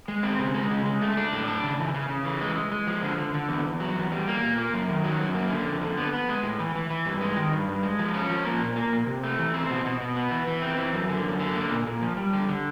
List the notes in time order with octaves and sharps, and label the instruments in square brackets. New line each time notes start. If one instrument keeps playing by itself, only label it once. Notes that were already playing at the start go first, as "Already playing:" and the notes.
[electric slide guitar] G#3
C4
C#3
G#3
C#3
G#3
A3
D4
A2
D4
C#3
E3
C#3
C#3
E3
G#3
G#3
G#3
F3
D3
D3
D3
E2
E2
F#3
E2
G3
A#3
A#2
A#3
F#2
D#3
F#3
F#2
A#3
D3
F2
D3
B3
B3
G#3
A2
E3
E3
E3
G2
G#3
D#3
G2
G2
G#3
F3
C#4
F3
A#3
A#2
A#3
A#2
C3
A3
E3
C4
B2
B2
B2
B3
E3
E3
C4
E3
F#2
D3
F#2
D3
A#3
A#2
A#2
F3
G3
D3
D3